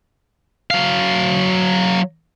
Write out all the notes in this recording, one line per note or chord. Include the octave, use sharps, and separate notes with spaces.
F#3 F5